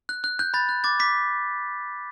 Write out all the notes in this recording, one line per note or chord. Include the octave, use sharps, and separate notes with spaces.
F#6
F#6
F#6 G6
B5 A6
F#6
D6 A6
D6 B6